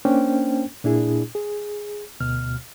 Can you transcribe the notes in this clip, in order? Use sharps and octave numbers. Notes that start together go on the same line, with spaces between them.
A#3 C#4 D4 C5 G5
A#2 D4 E4 G#4
G#4
D2 B2 F6